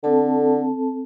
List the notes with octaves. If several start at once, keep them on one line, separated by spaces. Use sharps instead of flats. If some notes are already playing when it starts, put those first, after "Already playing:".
D3 C4 A4 A5